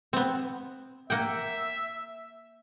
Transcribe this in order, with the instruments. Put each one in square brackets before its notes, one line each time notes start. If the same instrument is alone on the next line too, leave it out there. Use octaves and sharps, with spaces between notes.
[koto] B3 C4
[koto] A#3 F#5 G5 [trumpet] E5